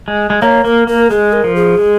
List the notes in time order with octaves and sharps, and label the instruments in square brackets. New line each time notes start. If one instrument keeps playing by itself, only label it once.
[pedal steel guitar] G#3
G#3
[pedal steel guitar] A#3 [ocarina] C#5
[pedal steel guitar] A#3 [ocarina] A#4
[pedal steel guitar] A#3 [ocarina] A#4
[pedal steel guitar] G#3 [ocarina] G#4
[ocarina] A#4
[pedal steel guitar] F3
[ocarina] G#4
[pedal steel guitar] G#3